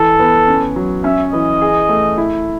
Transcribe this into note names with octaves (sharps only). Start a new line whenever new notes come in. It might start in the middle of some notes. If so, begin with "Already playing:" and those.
Already playing: E3 A4
B3
C#4
F#3
C#4 E5
E3 D#5
G#4
A3
E4